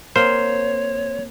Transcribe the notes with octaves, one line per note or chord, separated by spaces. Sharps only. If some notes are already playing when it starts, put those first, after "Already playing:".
A#3 C4 C5 C#5 F5